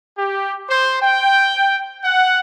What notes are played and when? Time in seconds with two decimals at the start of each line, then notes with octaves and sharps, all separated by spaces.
0.16 G4
0.68 C5
1.00 G5
2.02 F#5